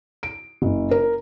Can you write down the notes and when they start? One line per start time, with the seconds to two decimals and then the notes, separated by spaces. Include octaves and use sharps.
0.23 D7
0.62 F#1
0.91 A#4